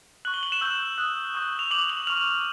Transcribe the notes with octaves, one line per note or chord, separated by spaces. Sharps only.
C#6 F#6 F#7
G7
F#7
E7
C#6 E6 G6
D#6 F#6
C#6 E6 G6
F7
D6 G6 F#7
F#7
C#6 F6 F7